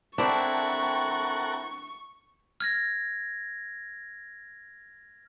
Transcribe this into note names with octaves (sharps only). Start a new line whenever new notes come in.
C4 D4 E4 A4 A#4 F#5 C#6
F6 G#6 A#6